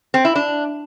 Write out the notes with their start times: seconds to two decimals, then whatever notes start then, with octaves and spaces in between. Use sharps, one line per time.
0.14 C4
0.25 E4
0.35 D4